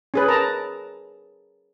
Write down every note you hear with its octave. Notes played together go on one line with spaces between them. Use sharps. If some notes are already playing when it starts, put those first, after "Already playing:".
C#4 G#4 B4
A#4 A5 A#5